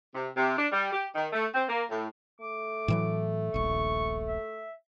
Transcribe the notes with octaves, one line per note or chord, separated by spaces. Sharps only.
C3
C3
D4
G3
G4
D#3
A3
C4
A#3
A2
A3 D6
A2 E3 F#3
D#1 A#1 C#6
E5